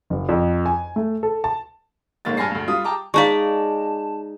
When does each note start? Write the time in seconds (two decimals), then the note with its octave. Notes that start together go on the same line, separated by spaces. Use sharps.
0.10 F#1
0.29 F2
0.66 G#5
0.96 A3
1.23 A4
1.44 A5
2.25 G1 G#2 A#3 A6
2.37 G2 G#5 A5 B5 A#6 C7
2.51 D2 G2
2.67 G3 F4 D#6
2.84 G5 A5 A#5 D6
3.14 G#3 D#4 D5 F5 A5 A#5 C#6